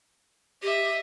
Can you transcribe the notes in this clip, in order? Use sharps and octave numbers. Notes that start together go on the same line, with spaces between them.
G4 D#5 E5